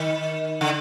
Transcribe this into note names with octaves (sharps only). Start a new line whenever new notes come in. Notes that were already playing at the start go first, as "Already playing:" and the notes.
Already playing: D#3
D3